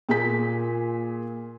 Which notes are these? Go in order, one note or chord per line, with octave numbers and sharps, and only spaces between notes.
A#2 G#4 B6